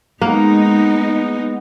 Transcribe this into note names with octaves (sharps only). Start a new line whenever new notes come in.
G#3 A#3 B3 D#4